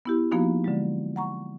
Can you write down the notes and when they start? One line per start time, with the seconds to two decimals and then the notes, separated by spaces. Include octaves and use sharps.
0.06 B3 E4 G4
0.31 F3 A#3 B3 D#4 F#4
0.64 D3 F#3 G#3
1.16 F#5 A#5 C#6